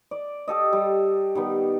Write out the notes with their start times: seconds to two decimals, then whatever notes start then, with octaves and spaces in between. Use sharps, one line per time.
0.11 D5
0.48 G4 A4 D#5
0.73 G3
1.35 D#3 G3 B3